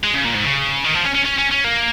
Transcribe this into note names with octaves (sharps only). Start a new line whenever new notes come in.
G#3
C#3
A#2
G#2
C#3
D#3
F3
C#4
C#4
C#4
C#4
C#4
A#3